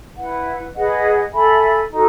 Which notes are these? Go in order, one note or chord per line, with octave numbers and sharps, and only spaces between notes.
E4 B4 F#5
G#4 B4 D#5 F#5
A4 E5 G#5 B5
D#4 F#4 A4